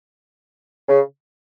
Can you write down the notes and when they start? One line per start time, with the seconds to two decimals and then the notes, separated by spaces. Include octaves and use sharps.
0.87 C#3